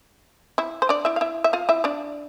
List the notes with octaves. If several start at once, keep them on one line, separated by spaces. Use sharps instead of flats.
E4 E5
C5
D4 D5
E4 E5
F5
E4 E5
E5
F4 F5
E4 E5
D4 D5